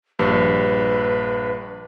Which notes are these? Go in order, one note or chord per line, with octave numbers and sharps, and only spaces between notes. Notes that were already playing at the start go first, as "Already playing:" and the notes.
A#1 G2 B4